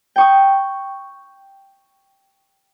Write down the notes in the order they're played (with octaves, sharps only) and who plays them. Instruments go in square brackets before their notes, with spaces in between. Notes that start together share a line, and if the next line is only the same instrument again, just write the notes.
[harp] G5 C#6 D#6